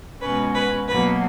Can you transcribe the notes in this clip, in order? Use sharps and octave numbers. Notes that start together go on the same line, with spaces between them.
B2 G#3 C#4 B4
B4
B2 F#3 A#3 B4